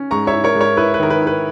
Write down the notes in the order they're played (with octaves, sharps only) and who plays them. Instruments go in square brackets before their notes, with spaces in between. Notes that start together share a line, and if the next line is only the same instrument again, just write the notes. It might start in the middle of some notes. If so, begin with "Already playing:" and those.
Already playing: [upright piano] C#4
G#2 A#5 C#6
C#5 E5
E4
A#4 C#5
G#2
A#4 C#5
E4 B4
B4
D#3 A#4
B4
E4
B4